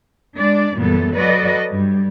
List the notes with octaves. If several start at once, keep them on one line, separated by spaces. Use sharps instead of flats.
G#3 D4 D5
F#2 A#2 E3 G3 B3 A4
F#3 F#4 A4 B4 D5 D#5
G2 G3